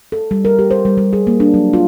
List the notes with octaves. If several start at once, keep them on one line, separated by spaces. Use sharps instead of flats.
A4
G3
A#4
G4
C5
G3
G3
G#4
A#3
D4
F#3
F4